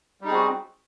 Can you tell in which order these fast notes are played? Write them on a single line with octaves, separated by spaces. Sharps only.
G3 D#4 G#4 C4 F#4